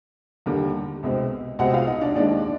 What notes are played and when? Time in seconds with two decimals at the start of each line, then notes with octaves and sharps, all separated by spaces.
0.46 D#2 D3 G3 A#3
1.03 C2 B2 G#3 C4
1.59 C2 B2 G#3 C4 F#4 F#5
1.73 F4 F5
1.87 D#4 D#5
2.01 D4 D5
2.15 D#2 D#3 G#3 D4 D5